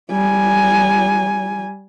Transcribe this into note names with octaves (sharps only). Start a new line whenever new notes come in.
G3 G#5